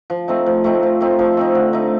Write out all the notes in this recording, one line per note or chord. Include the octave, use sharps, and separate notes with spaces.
F3
A3 C4 D#4
F3
A3 C4 D#4
F3
A3 C4 D#4
F3
A3 C4 D#4
D3
A3 D#4